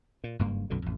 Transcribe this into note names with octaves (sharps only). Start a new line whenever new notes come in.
A#2
F#1 G2 A#3
B1 F#2 B2 D3
A1 F2